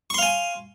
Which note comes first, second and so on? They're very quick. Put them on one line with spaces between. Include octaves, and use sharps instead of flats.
C#6 C6 F5 G#5